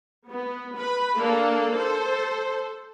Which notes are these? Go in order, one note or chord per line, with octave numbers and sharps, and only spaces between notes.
B3
B4 B5
A#3 D4 A4
A4 C5